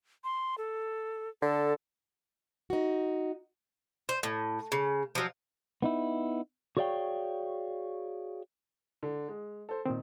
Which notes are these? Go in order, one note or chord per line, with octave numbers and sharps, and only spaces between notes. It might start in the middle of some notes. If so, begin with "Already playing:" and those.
C6
A4
D3 A4
D#4 F#4
C5
A2
C#3
F3 F#3
B3 D#4 E4
F#4 G#4 C#5 D5 F5 G5
D3
G#3
A4 C5
A#2 D#3 C4